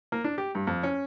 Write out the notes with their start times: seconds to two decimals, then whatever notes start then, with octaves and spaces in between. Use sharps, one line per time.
0.12 A#3
0.24 D4
0.38 G4
0.55 G2
0.67 F2
0.83 C#4